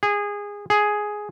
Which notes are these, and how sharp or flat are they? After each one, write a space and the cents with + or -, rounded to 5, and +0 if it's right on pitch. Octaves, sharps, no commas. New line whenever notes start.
G#4 -20
G#4 +5